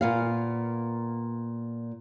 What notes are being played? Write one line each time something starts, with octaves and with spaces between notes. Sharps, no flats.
A#2 B3 F5